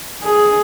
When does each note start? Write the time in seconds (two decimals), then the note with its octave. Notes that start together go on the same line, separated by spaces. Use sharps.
0.22 G#4